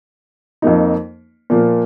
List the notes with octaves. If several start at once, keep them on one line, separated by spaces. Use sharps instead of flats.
F2 F3 A#3 D#4
A#2 F3 A#3